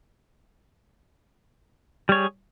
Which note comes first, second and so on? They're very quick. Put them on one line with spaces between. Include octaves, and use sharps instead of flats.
G3 C#5 G#4